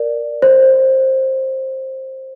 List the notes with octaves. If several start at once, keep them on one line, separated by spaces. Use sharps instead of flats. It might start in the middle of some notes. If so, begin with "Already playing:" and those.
Already playing: A#4 D5
C5